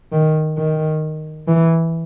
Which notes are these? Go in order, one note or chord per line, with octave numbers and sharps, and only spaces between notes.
D#3
D#3
E3